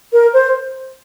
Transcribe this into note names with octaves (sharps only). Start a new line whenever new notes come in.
A#4
C5